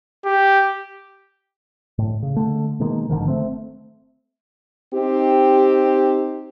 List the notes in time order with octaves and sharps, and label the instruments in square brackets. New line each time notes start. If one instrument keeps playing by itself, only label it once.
[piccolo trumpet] G4
[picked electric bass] A2
C#3
D3 A3
B2 D#3 G#3 A#3
G#1 D3 D#3 F3
A3 C4
[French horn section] C4 D#4 G4